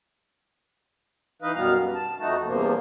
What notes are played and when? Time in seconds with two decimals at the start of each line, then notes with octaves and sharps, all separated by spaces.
1.42 E3 D#4 B4 D#5 F5
1.55 F#2 B2 G3 B3 F5 A#5
1.76 G2
1.95 A5
2.19 F2 A3 D#4 F#4 A5
2.46 E2 G2 C3 F3 A#3